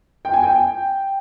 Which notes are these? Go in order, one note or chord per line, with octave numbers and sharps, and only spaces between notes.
G5
G#5
G5